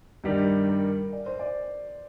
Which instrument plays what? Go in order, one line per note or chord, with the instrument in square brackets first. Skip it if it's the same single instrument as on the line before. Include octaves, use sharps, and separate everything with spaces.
[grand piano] G2 D#3 G3 [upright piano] A#4
[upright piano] A#4
D5
C5
D5